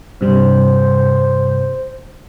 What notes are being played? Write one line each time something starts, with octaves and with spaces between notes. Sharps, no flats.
G2 C3 G3 C5